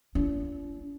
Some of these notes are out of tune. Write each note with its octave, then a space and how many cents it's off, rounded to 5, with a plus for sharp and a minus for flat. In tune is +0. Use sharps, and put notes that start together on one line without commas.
D4 -45 F4 -45